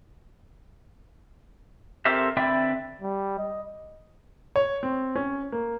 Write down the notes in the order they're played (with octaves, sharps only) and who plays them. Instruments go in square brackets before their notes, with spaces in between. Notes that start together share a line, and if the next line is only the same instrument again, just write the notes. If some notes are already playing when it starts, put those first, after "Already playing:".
[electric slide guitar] C4 G4 A4 A#4 C5 E5
D3 C4 B4 D5 E5 G5
[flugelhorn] G3
D#5
[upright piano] C#5
C4
C#4
A#3